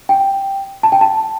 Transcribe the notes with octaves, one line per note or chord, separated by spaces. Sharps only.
G5
A5
G5
A5